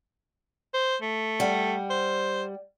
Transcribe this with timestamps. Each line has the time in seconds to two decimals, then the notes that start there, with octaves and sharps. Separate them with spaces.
0.74 C5
1.02 A3
1.40 G3 F#5 G5
1.90 C5